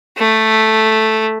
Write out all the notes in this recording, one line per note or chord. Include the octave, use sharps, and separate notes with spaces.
A3